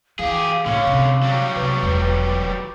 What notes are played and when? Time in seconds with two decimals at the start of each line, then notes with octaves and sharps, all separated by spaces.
0.19 E3 G4 G#4 F5
0.66 A2 D3 C#4
0.87 C3
1.23 F#3 G3
1.55 C3 B4
1.83 E1